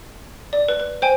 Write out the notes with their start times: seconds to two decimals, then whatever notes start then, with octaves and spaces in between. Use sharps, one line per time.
0.53 D5
0.69 B4
0.80 B4
1.02 C5 G5 G#5